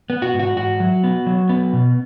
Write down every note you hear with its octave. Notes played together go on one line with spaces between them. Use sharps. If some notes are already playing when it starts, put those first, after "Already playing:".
B3
F#4
G#2
F#4
G#2 F#4
F#3
B3
F#3
B3
B2